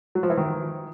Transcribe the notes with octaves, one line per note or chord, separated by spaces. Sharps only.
F#3
F3
E3
D#3